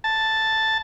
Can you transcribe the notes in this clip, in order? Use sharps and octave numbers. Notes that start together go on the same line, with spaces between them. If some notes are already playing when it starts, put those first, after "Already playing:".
A5